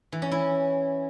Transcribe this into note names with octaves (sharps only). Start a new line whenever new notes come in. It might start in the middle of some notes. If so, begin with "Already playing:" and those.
E3
C#4
E4